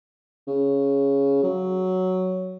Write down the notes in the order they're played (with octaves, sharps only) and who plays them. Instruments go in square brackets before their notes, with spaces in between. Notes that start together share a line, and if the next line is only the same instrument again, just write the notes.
[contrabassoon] C#3
F#3